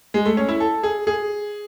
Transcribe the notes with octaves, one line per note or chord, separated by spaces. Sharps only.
G#3
A3
C#4
E4
A4
G#4
G#4